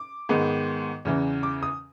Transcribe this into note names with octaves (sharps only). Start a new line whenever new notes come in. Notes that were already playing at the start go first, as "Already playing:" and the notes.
Already playing: D6
G#2 D#3 G#3 B3
E2 C#3 E3
D6
D#6